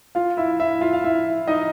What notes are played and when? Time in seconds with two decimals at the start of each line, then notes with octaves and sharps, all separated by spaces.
0.15 F4 F5
0.37 E4 E5
0.59 E4 E5
0.81 F4 F5
0.93 F5
1.04 E4 E5
1.48 D#4 D#5